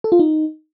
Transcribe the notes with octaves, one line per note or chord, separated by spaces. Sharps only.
A4
F4
D#4